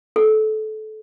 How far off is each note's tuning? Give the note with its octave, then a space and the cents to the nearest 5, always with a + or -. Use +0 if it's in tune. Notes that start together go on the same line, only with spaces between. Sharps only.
A4 -25